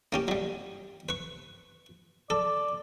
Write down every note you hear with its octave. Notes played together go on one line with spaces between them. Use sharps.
A#3 C#4 G4
F#3 G3
B4 C#6
A4 D5